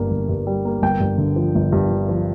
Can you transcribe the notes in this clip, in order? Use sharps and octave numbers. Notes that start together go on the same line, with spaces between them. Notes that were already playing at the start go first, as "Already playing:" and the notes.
Already playing: G1 G2 G3 A#3
G1
G2
G3
A#3
G1 G5
G2
D3
F3
G1
G2
D3
F3